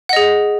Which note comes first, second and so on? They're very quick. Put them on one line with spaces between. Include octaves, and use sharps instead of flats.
F#5 D#5 G#4